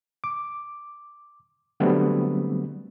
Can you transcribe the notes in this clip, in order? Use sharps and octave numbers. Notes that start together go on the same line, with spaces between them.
D6
D3 F#3 G3 A3 B3 C4